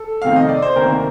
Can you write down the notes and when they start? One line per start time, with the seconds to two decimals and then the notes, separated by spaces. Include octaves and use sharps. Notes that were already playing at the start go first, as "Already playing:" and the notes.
Already playing: A4
0.22 F2 C3 D#3 A3 C4 F5
0.36 D#5
0.49 D5
0.62 C5
0.76 D2 C3 D#3 A#3 A#4